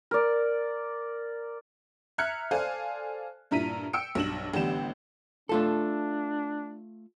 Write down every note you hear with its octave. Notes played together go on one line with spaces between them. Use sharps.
A#4 D5
E5 A#5 F6 F#6 G#6 C#7
A4 C5 D5 F5 G#5
G2 A#2 E4 A#5 B6 D#7
G5 E6 C#7 D7
B1 G2 E7 F#7
A1 D3 G3 B3 G5 E7
A3 D4 F4 A4